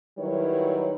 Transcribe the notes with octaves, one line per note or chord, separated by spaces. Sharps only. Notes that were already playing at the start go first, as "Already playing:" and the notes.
D#3 F#3 G3 E4 B4 C#5